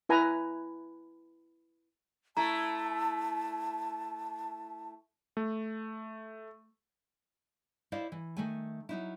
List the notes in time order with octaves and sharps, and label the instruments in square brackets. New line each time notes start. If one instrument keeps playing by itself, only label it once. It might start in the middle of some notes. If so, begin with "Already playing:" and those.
[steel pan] E4 B4 G#5 A#5
[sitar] A3 E4 [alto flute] A5 [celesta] A#5
[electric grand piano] A3
[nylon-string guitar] E4 C5 D5 D#5 F5
E3
D#3 A3 G#5
F#3 D#4 E4